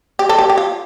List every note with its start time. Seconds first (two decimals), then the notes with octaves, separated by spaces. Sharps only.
0.19 G4
0.29 A4
0.38 G4
0.50 G4
0.58 F4